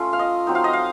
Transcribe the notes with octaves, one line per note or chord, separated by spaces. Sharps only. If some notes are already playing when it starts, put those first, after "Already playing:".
Already playing: A3 C#4 F4
F5
D#5
F#3 C4 D#4
F5
D#5
F5